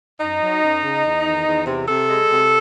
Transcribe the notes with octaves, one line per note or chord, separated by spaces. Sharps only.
F#2 D#4
F#3
F#2
C#3
E2
D#3
E2
C3
C3 A4
G#3
C3